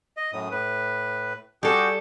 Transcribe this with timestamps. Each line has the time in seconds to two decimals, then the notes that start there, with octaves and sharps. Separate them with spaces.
0.17 D#5
0.33 F#2 A2 D#6
0.51 A2 B4
1.63 G3 F#4 G#4 A4 G5